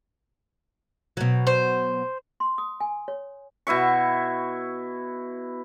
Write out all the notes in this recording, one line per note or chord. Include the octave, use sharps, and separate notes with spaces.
B2 F#3
C5
C6
D#6
G#5
C#5
B2 E4 E5 C#6